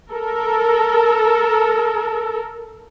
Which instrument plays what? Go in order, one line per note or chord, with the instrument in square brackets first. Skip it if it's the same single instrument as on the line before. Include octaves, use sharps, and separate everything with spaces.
[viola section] A4 A#4